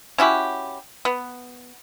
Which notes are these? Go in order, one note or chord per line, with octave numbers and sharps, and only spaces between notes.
C#4 E4 F#4 G4
B3